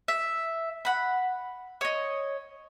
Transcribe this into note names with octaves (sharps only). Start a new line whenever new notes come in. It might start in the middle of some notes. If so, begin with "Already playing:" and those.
E5
F#5 B5
C#5 D#5